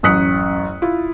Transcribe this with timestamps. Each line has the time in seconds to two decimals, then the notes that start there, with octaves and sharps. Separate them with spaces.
0.03 A1 F#2 D#6 F#6 B6 C#7
0.82 E4 F4